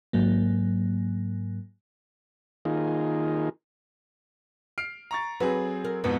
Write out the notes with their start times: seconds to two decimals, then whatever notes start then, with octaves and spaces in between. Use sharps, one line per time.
0.13 G#2 F#3 A#3
2.65 D#3 A#3 D#4 F4 G#4
4.78 F6 C7 D7
5.11 A#5 C#6 A6
5.40 F#3 C4 F#4 G#4 B4
5.84 A#4
6.04 F2 G#2 B2 B3